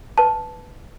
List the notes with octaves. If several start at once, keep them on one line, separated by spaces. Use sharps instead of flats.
B4 A5